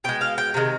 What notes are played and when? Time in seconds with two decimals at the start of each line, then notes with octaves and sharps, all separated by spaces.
0.04 B2 G#3 G5
0.21 F5
0.38 G5
0.54 C3 D#3 G#3